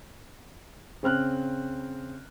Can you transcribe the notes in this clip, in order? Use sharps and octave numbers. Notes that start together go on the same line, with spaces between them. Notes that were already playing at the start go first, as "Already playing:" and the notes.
C#3 C4 F6 F#6